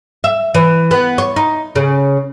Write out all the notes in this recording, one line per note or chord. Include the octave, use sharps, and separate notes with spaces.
E5
E3
B3
C#5
D#4
C#3